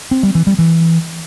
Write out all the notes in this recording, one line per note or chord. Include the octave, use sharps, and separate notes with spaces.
C4
G3
E3
G3
E3